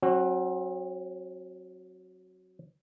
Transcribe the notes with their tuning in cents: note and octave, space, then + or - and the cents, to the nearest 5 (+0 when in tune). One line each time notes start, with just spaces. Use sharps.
F#3 +0 C4 +40 F#4 +0